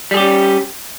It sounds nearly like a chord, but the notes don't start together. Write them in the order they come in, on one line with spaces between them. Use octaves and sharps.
G3 G#4 G4 C#4